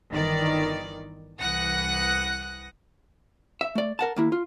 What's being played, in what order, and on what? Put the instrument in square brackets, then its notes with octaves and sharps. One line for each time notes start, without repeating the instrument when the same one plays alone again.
[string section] G1 D#3 E3 D5
C2 E3 F#5 D#6 F#6 A#6
[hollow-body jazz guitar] E5
A3 D5
A#4 F#5 A5
D#2 A#3 E4
F4